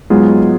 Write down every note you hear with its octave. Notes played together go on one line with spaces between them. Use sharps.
G#2 F#3 G#3 B3 F4 G#4